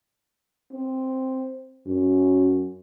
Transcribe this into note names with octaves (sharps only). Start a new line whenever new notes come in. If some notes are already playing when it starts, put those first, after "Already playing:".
C4
F#2